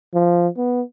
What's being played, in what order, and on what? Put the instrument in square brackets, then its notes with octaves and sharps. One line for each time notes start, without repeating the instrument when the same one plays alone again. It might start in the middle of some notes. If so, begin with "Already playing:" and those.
[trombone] F3
B3